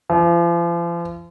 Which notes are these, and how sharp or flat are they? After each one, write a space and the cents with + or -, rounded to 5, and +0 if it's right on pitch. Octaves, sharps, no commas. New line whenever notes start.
F3 -40